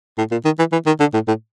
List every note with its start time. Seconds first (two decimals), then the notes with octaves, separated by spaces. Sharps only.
0.18 A2
0.32 A#2
0.45 D#3
0.59 E3
0.73 E3
0.86 D#3
1.00 D3
1.14 A2
1.28 A2